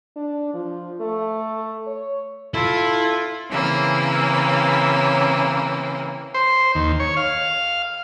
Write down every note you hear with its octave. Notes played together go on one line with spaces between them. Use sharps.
D4
F3
A3
C#5
E4 F4 A4
C#3 E3 A#3 C4
C5
D#2
C#5
F5